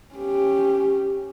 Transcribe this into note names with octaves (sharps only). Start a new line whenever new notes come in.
C#4 G4